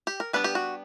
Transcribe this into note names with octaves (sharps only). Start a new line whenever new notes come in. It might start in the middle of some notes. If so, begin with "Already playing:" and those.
G4
A#4
G3 B3 D4 B4
G4
F#4